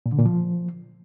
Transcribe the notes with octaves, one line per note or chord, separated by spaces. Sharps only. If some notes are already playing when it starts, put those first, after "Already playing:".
A#2
D3
A#2
F3